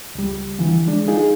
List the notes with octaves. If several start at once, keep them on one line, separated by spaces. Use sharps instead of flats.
C#2 G3
D3 E3 F3
G#3 D4
D#4 F4 G#4